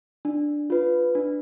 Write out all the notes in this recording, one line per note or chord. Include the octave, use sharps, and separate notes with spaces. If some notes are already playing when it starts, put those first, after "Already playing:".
D4
F4 B4
D4